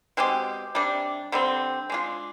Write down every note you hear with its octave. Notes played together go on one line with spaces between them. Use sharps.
B2 G#3 C4 G4
C3 G3 D4
D3 G3 C4
G#3 D4 F4